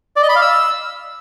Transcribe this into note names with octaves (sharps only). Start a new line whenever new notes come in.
D5
D#5
B5
F5
E6